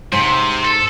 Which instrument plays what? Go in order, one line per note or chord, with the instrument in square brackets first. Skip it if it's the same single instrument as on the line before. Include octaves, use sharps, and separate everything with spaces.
[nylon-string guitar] G#2 [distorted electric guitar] C3 [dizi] C6
[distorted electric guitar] A4